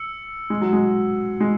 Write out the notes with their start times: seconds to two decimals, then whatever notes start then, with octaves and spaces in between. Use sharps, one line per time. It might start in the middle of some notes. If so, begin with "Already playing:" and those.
Already playing: E6 C#7
0.50 G#3
0.61 F#3
0.73 G#3
1.40 G#3